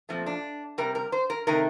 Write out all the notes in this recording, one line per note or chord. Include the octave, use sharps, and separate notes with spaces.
A#2 F3 A3 C4
D4
C3 G3 A#4
A#4
C5
A#4
C3 D#3 A3 A#4